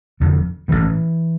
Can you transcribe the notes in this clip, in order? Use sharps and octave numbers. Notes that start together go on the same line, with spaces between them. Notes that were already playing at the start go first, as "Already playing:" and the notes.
F1 F2 D3
A1 G#2 E3